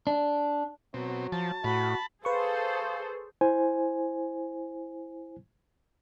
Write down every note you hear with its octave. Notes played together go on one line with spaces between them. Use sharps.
D4
B2 F#3 C4
F3 A5
A2 F#4 B5
G#4 A4 B4 C5 F5 C#6
E4 C5 G#5